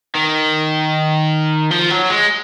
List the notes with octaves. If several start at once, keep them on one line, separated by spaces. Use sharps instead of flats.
D#3
F3
F#3
G#3